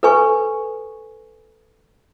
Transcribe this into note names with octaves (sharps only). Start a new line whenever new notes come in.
A4 B4 G#5 C#6